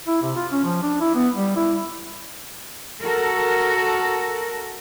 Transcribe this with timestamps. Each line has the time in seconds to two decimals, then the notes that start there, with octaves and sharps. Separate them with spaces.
0.07 E4
0.22 C3
0.36 F4
0.51 C#4
0.64 F3
0.83 D4
1.01 E4
1.15 B3
1.34 G3
1.56 E4
3.05 F#4 A4 A#4